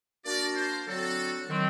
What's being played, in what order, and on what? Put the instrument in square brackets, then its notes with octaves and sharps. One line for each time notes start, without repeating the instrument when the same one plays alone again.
[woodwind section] A#3 D4 F#4 A#4 [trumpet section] D5
[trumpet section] C5
[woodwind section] D3 F#3 C4 F#4 [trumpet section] A4
[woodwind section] D#3 F#3 C4